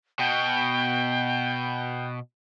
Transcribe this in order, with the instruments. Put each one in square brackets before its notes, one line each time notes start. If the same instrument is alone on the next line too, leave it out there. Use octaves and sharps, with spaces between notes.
[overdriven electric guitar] B2 [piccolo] G5